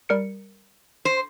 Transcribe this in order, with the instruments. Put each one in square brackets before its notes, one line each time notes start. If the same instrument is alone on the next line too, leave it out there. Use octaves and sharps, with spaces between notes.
[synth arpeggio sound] G3 A#4 C#7
[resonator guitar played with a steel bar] C5